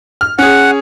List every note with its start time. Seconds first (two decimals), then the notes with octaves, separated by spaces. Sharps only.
0.21 F6
0.39 C#4 G#4 F#5